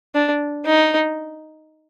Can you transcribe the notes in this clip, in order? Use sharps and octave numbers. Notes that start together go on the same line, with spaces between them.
D4
D#4